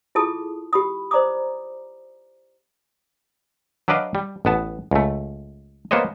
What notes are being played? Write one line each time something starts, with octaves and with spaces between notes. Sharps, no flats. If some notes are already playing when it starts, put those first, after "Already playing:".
E4 F4 G#4 A4 A5 D#6
G4 B5 D#6
C5 D5 A#5 D6 D#6
F#3 D4 B4 D5 D#5 F5
G3
A1 B3 A5
C#2 A3
A#3 B3 F#4 C5 C#5 D#5